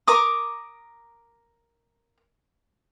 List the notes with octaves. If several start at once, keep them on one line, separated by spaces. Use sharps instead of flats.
A#4 A#5 D6 D#6